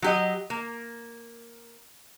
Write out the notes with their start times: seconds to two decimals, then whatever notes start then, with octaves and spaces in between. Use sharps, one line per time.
0.02 F#3 G4 D#5
0.50 A#3